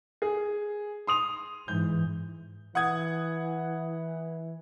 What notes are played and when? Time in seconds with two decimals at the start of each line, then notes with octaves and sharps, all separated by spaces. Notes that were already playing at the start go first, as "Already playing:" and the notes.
0.22 G#4
1.07 C6 D#6 F7
1.68 G#2 E3 G6
2.75 E3 F#5 D#6 G#6